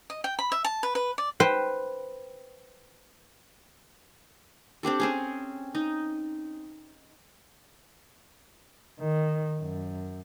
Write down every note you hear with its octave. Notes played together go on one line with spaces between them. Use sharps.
D#5
G5
B5
E5
A5
B4
B4
D5
B4 C5 G5
C4 D4 G4 A4
C4 C#4 G#4
D#4
D#3
F#2